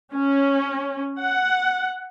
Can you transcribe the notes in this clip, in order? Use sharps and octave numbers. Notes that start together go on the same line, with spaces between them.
C#4
F#5